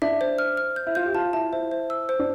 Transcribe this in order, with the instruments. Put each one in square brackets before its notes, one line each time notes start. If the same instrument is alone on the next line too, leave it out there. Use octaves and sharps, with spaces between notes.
[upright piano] D4 [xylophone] E5
[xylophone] C5
F6
F6
G6
[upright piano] E4
[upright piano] F4 [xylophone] G6
[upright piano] G4
[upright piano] F4 [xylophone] A5
[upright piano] E4 [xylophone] A5
[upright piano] E4 [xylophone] C5
[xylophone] C5
E6
C5
[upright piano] D4